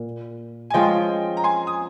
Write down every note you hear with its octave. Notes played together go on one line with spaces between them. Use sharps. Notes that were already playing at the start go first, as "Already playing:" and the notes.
Already playing: A#2
G#5
F3 G#3 C#4 F4 D#5 G5
A#5
G#5 C6
D#6